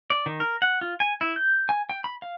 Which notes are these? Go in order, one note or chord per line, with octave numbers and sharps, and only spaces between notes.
D5
D#3
A#4
F#5
F4
G#5
E4
G6
G#5
G5
B5
F5